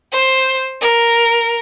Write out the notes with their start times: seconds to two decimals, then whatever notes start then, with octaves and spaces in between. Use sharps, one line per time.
0.13 C5
0.81 A#4